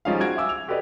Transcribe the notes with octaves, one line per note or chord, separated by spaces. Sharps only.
F3 G3 C#4 D#4 G#4 F5
F#4 G#6 D7
E5 F5 G#5 D6 E6
F7
F#4 G4 A4 B4 D5 D#5